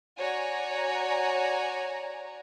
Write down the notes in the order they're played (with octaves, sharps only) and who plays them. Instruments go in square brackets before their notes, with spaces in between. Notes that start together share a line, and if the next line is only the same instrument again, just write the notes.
[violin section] F#4 C#5 D5 G#5 A#5